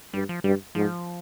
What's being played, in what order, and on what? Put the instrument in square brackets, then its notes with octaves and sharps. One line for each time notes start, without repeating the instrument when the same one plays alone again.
[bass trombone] G2 [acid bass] G3
[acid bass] F3
[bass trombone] G2 [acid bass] G3
[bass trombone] G#2 [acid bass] F3